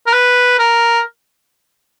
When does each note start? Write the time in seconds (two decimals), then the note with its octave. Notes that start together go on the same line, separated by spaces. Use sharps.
0.07 A#4
0.13 B4
0.59 A#4